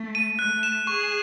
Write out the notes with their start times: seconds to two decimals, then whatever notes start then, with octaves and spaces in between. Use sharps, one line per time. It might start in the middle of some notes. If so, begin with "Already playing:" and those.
Already playing: A3
0.15 D#7
0.39 A3 F#6
0.63 E7
0.87 G#4 C#6